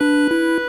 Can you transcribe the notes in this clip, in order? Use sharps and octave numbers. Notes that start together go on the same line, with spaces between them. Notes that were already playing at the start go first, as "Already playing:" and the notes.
D4 B4
E4